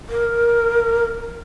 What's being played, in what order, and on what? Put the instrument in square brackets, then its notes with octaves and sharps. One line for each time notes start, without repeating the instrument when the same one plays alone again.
[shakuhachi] A#4